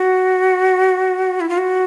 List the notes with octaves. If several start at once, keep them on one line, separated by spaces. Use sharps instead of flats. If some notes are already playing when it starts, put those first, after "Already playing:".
Already playing: F#4
E4
F4
F#4